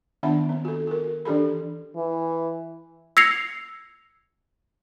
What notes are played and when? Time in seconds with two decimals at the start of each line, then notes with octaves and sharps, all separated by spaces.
0.23 D#3 B3 D4 E5 F#5 B5
0.49 C4
0.65 F#4 A4
0.87 F#4 A#4
1.25 E3 D4 G4 A4 B5
1.96 E3
3.17 E6 G#6 A#6 C7 C#7 F7